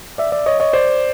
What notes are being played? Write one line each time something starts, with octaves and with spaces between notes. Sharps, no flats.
D5 E5
D5 E5
C#5 D#5
C#5 D#5
C5 D5